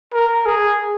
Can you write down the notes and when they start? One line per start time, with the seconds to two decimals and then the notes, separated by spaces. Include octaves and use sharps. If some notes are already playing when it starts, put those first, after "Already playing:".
0.13 A#4
0.46 G#4